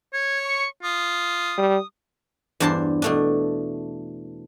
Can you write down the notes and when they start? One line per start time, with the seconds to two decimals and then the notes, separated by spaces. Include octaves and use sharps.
0.13 C#5 G#6
0.44 C#6
0.83 F4 D#6
1.58 G3
2.60 E2 G2 D4 C5 A5 C6
3.02 B2 A3 D4